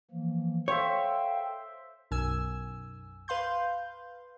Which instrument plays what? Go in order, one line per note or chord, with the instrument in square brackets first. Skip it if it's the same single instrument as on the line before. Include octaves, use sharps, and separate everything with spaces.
[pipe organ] E3 F3 A#3
[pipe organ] A4 F5 G5 [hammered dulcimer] C5 E5 [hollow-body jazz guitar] C#5
[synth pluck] B1 F#2 G#5 E6
B4 F5 C6 G6